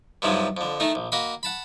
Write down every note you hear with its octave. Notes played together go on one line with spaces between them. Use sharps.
G2 C3 D#3 F3 F#3 G#3
F2 D3
D#3 A3 D#4
A#1
A#3 F#4 D#5 B5
F#5 A5 B5